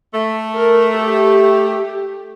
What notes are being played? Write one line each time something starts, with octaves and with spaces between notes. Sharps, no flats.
A3
A#4
G4